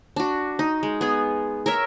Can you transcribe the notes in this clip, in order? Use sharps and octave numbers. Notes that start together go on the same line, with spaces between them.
D4 F#4
D#4
G#3
B3 G#4
A#4 C#5 E5